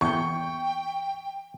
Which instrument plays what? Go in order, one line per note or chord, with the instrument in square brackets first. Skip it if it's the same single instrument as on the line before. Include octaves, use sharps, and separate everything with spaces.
[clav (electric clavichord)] E2 [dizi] G5 [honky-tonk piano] C#6 G6